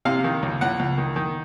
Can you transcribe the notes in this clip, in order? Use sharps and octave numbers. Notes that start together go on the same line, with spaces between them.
C3 F5
D#3
C#2
C#2 F#5
C#2
D#3
D#3